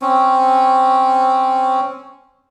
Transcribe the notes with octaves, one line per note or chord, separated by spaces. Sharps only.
C4 C#4